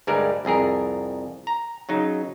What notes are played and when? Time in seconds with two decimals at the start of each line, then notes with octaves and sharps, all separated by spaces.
0.07 D2 G2 G3 G#3 A#4 D5
0.45 C2 F2 G#4 A#4
1.47 A#5
1.89 C#3 F#3 D#4